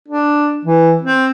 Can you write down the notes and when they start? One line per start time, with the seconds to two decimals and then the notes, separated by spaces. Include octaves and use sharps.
0.08 D4
0.65 E3
1.02 C4